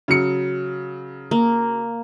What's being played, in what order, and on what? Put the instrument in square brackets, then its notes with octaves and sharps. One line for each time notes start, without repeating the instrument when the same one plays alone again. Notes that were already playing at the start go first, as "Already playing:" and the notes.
[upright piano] C#3 F#3 C#7
[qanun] A#3